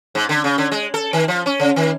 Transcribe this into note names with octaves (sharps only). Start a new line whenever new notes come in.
G#2
D3
C#3
D3
G#3
A4
D#3
F3
C#4
C#3
D#3